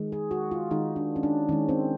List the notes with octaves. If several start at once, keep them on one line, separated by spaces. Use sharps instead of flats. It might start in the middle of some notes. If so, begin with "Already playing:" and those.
Already playing: D#3 G#3
G#4
F#4
F4
D#3 G#3 D#4
D4
C#4
D4
D#3 G#3 C#4
C4